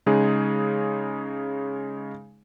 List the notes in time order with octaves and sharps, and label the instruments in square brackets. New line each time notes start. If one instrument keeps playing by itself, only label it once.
[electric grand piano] C#3 G#3 D#4 G#4